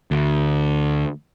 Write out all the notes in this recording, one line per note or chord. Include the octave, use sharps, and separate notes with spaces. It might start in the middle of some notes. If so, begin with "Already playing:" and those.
D2